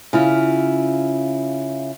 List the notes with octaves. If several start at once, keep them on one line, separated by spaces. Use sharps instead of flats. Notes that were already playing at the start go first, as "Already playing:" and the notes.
C#3 E4 F4